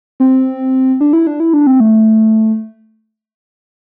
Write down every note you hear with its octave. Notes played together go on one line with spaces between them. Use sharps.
C4
D4
E4
D4
E4
D4
C4
A3